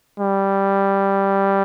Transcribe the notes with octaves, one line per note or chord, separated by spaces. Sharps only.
G3